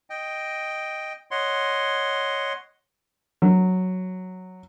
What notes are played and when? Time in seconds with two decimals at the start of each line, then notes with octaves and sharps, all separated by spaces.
0.10 D#5 G5
1.31 C#5 D#5 F#5 C6
3.42 F#3